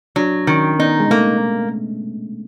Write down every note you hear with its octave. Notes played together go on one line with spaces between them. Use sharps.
F#3 D4
D#3 C#4
B3 D#4
G#3
A3 A#3